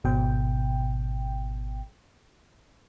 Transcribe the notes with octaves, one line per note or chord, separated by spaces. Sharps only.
G#1 B2 G5